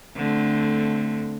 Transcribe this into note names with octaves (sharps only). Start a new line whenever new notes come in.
D3 A3 C4